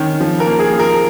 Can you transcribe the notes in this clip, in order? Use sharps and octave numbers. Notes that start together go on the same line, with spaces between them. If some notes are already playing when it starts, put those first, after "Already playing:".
Already playing: D#3 C#4
F3
A#4
A#3
G#4
F3
A#4